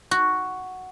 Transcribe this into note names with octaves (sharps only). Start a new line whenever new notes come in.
F#4